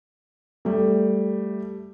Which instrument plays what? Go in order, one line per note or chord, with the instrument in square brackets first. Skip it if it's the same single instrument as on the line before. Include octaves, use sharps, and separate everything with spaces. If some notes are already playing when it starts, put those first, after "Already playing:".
[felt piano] G3 A3